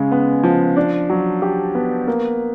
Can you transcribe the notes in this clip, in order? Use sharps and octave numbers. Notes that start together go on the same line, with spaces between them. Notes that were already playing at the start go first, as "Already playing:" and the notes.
Already playing: C#3 G#3
B3
F3
D4
F#3
G4
B3
A#3